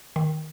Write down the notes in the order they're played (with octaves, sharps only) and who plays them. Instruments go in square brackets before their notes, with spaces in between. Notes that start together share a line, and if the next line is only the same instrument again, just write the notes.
[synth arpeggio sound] D#3